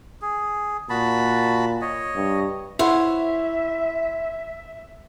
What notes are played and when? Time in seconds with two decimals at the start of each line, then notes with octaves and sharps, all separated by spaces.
0.22 G#4
0.90 A#2 F#4 A5 B5
1.81 C#5 D#5
2.16 G2
2.79 E4 C5 C#5 E5 F#5